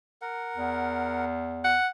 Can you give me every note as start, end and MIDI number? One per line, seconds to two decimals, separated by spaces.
0.22 1.25 70
0.22 1.25 78
0.57 1.77 40
1.64 1.88 78